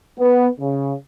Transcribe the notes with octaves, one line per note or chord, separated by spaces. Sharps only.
B3
C#3